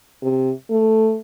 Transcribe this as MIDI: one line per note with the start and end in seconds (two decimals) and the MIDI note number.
0.22 0.51 48
0.71 1.18 57